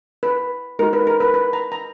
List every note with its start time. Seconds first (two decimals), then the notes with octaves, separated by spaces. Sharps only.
0.23 B4
0.79 G#3 D#4 F#4 A#4
0.93 B4
1.07 A#4
1.20 B4
1.34 B4
1.53 A#5
1.72 A#5